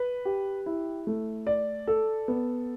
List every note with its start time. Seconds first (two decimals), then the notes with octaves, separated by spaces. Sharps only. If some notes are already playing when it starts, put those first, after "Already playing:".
Already playing: B4
0.25 G4
0.66 E4
1.07 A3
1.47 D5
1.87 A4
2.28 B3